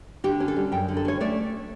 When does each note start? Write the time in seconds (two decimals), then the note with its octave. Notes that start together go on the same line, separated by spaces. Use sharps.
0.24 D3 G4
0.40 C#4
0.48 A4
0.56 G3
0.72 F#2 G5
0.88 D3
0.97 A4
1.05 C#4 C#5
1.20 A3 D5